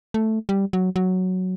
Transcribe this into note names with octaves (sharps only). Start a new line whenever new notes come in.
A3
G3
F#3
F#3